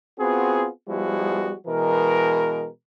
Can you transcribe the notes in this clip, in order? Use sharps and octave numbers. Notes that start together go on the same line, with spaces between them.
B3 C4 F4 F#4 G#4
F3 G3 G#3 B3 E4 F#4
B2 E3 G#3 A#4